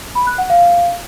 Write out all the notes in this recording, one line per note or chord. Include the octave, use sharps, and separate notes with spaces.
B5
F#6
F#5
F5